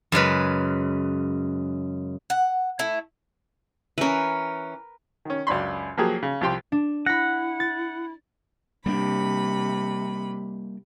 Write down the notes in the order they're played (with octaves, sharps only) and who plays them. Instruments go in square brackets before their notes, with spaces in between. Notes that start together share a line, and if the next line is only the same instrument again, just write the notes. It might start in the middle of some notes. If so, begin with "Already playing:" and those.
[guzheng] F#2 C#3 G#3 B4
[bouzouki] F#5
A3 E4
[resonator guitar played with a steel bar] E3 C#4 [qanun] A#4 B4
[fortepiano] D#3 C#4
C#2 F#2 D4 B5 C6
F3 F#3 A#3 G4 G#4
C#3
C2 F3 G4 G5 C6
[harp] D4
[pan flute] E4 [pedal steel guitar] F#5 [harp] B5 A#6
[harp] A6
[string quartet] C3 B5 [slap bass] G3 A#3 D4